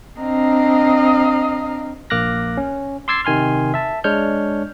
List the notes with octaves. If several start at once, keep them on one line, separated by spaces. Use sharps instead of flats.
C4 D4 D#5 F5 A#5
A#1 A#3 D6 F6 F#6 A#6
C#4
C6 D6 E6 G#6 A6 C7
C3 D#3 G#5 C6 F6
E5 A5
G#3 D4 C#5 C#6 F6 G6